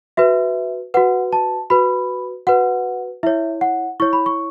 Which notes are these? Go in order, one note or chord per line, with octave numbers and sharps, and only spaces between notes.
F#4 B4 E5
F#4 B4 F#5
A5
F#4 B4 B5
F#4 B4 F#5
E4 C#5 E5
F#5
E4 C#5 C#6
B5
C#6